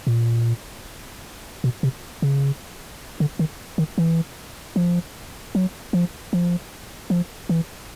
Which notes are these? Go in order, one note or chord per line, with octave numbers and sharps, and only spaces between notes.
A#2
B2
C3
C#3
D3
D#3
D#3
E3
F3
F#3
F3
F3
F3
E3